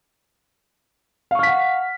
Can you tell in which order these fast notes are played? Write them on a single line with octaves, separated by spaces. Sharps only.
F5 C#6 F6 B6 F#5